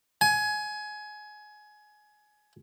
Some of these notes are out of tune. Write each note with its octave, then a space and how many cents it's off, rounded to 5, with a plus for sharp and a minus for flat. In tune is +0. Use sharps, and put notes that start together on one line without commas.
G#5 +20